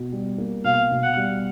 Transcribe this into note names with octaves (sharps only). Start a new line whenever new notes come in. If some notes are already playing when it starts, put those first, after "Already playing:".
Already playing: B2
G3
A#3
B2 F5
B2
F#5
G3